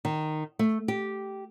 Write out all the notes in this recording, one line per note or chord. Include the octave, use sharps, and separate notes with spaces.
D#3
A3
G4